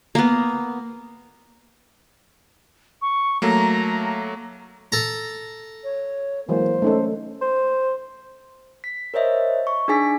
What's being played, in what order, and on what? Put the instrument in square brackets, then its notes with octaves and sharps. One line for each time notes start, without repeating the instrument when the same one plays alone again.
[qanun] A#3 B3
[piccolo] C#6
[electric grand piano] F#3 A3 A#3 [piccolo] A#5
[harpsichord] A4 A#5
[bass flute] C#5
[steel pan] E3 F#3 G#3 [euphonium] A#3 [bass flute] C5
[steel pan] A3 D#4 A4 [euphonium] C#4
[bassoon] C5
[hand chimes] B6
A#4 C5 C#5 D#5 E5
C#6
D4 D#4 G#4 G#5 B6